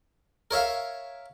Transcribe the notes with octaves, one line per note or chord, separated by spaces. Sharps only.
A#4 C#5 E5 F5